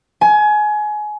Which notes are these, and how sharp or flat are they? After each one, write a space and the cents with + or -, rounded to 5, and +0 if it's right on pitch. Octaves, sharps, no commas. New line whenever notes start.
G#5 +25